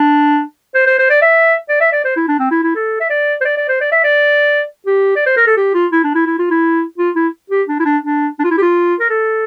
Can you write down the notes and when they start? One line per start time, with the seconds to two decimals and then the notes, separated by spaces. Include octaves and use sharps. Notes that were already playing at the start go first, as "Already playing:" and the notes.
Already playing: D4
0.75 C5
0.87 C5
0.99 C5
1.10 D5
1.22 E5
1.69 D5
1.81 E5
1.92 D5
2.04 C5
2.16 E4
2.28 D4
2.39 C4
2.51 E4
2.63 E4
2.75 A4
3.00 E5
3.10 D5
3.41 C5
3.45 D5
3.57 D5
3.68 C5
3.81 D5
3.92 E5
4.04 D5
4.86 G4
5.16 D5
5.26 C5
5.37 A#4
5.47 A4
5.57 G4
5.74 F4
5.92 E4
6.04 D4
6.15 E4
6.27 E4
6.39 F4
6.51 E4
6.98 F4
7.16 E4
7.50 G4
7.68 D4
7.80 E4
7.85 D4
8.03 D4
8.39 D4
8.44 F4
8.51 E4
8.58 G4
8.62 F4
9.00 A#4
9.10 A4